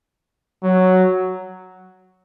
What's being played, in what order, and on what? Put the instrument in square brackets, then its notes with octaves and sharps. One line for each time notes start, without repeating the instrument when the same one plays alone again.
[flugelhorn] F#3